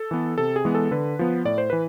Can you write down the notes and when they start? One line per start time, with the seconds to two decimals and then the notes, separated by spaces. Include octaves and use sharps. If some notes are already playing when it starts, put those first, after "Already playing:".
Already playing: A4
0.11 E3 B3
0.38 C3 A4
0.56 G#4
0.65 E3 G#3 B3
0.75 A4
0.91 D3 B4
1.19 F3 B3
1.45 A2 D5
1.58 C5
1.70 E3 B4